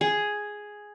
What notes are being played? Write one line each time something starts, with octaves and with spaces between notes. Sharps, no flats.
G#4